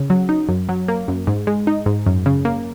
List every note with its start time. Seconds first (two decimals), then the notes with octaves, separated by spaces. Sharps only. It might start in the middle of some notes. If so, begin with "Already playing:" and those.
Already playing: C#3
0.10 F#3
0.29 D#4
0.49 F#2
0.69 F#3
0.88 A#3
1.08 F#2
1.27 G#2
1.47 G#3
1.67 D#4
1.86 G#2
2.06 F#2
2.26 C#3
2.45 A#3